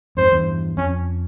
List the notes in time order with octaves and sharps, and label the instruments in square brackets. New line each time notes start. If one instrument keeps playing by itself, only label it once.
[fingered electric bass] F2 G#2 [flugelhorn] C5
[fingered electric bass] E2 G2
[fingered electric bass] F2 [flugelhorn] C#4